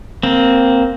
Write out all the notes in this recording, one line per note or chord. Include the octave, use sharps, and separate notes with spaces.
A#3 C4